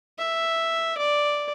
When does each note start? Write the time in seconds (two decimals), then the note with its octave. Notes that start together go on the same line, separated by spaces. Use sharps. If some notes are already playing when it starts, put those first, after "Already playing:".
0.18 E5
0.98 D5